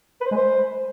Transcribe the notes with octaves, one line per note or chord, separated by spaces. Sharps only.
B4
C5
G#3
C5